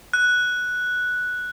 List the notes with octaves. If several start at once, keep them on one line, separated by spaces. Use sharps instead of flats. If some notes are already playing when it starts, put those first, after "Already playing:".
F#6